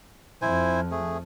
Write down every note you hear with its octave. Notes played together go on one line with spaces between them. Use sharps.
F2 F3 E4 C5 G#5
A3 G#4